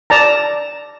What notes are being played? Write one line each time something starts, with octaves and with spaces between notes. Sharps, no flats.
D5 A5 A#5